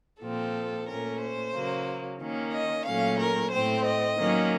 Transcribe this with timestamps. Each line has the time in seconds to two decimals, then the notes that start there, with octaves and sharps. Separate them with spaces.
0.22 A#2 F3 C4 A4
0.87 A#2 A3 C#4 A#4
1.21 C5
1.54 C#3 F#3 A#3
2.20 D#3 A#3 C#4
2.53 D#5
2.85 A#2 F#3 A3 C#4 F5
3.19 A#4
3.51 A2 A3 C4 C5
3.85 D#5
4.18 D#3 F#3 A#3 C#4